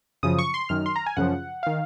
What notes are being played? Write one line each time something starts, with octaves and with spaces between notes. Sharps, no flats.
F#2 C#3 F3 D#6
C#6
C6
F#2 D#3 F6
C6
A#5
G#5
F#2 C#3 F3 F#5
D#3 F5